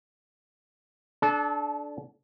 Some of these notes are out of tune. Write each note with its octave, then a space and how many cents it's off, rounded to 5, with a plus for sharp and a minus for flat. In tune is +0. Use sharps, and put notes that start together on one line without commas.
D4 +0 A4 -30 A5 -30